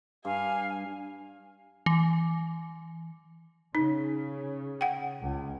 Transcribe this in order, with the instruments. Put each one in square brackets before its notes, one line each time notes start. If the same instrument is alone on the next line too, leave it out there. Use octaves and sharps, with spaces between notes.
[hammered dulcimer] G2 [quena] F5 [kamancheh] G#5
[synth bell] E3
[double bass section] C#3 [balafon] D#4
[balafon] F#5 G5
[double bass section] C#2